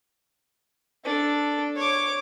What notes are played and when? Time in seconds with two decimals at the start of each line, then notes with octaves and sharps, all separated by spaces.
1.04 D4 A4
1.76 C#5 D6